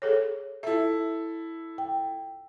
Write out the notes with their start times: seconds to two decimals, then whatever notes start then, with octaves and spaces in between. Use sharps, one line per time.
0.02 G#4 A4 C#5
0.63 E4 A4 E5
1.78 G5